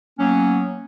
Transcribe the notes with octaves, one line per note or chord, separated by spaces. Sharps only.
F#3 A#3 B3 C#4